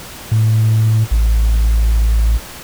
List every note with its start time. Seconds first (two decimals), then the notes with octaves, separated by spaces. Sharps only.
0.31 A2
1.11 A1